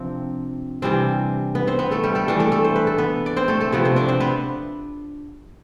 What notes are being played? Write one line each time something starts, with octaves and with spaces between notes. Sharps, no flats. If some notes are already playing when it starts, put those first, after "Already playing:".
Already playing: C3 F3 C4 D4
C3 E3 G3 C4 D4 C5
B3 B4
C4 C5
B3 B4
A3 A4
G3 G4
A3 A4
E3 G3 D4
A3 A4
A3 A4
C5
B4
A4
B3 B4
D5
C4 C5
A3 A4
A3 A4
C3 F3 A3 B3 B4
C4 C5
D4 D5
C4 C5
B3 B4